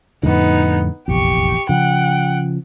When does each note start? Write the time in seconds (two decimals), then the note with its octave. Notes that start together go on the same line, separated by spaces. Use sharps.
0.23 F2 A2 D3 B3 D#4
1.08 F1 A#1 E2 G4 C#6
1.69 C#3 F3 F#5 G5